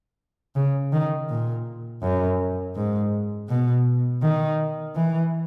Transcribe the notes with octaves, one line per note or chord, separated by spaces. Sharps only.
C#3
D#3
A#2
F#2
G#2
B2
D#3
E3